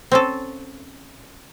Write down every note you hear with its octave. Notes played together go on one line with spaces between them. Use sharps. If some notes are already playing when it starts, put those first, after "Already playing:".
C4 C#4 A4